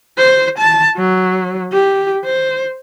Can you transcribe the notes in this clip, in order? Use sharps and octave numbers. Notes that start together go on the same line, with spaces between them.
C5
A5
F#3
G4
C5